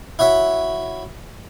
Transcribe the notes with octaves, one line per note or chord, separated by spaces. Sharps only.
E4 F#4 C#5 E5